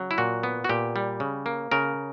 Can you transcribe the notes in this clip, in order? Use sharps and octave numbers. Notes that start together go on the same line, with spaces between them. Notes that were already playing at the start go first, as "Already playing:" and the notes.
Already playing: C#3 F#3
E4
A#2 F#4
B3
F#4
A#2 G4
G3
C#3
A#3
C#3 A#4